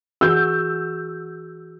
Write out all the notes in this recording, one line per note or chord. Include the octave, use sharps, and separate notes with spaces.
E3 F#4 G#4 E6 G6